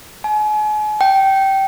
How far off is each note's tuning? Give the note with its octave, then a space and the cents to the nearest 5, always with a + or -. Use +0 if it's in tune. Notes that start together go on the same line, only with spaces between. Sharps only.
G#5 +40
G5 -15